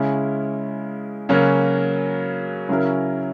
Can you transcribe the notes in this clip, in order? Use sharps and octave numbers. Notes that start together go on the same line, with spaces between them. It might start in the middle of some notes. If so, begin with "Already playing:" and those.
Already playing: C#3 G#3 C#4 E4
C#3 F#3 A#3 C#4 F#4
C#3 F#3 C#4 E4 A#4